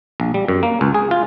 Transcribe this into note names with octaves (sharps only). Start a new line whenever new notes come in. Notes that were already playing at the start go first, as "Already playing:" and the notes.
A#1
G3
F#2
A#3
C#2
G#4
F4